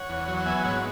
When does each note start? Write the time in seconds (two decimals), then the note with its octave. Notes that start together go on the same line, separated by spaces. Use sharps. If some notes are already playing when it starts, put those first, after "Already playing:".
Already playing: C#5 F#5
0.09 E2
0.28 F#3
0.37 F#5
0.46 B3 E5 G#5
0.64 G#2 C#5 F#5